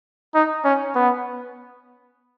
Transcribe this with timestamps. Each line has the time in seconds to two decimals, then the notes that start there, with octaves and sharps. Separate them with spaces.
0.35 D#4
0.64 C#4
0.95 B3